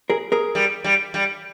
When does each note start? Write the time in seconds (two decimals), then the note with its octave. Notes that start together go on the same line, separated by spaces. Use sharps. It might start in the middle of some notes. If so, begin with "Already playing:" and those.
0.10 G#4 A#4
0.32 G#4 A#4
0.55 G3
0.84 G3
1.14 G3